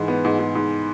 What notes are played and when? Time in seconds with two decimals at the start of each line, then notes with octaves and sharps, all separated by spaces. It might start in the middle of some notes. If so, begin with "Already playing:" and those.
Already playing: G#2 E3
0.08 B3
0.25 G#2
0.39 G#2
0.55 G#2